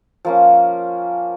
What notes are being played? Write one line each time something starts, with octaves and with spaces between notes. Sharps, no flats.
F3 A#3 C#4